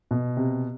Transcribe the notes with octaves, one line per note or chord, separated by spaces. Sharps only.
B2
C3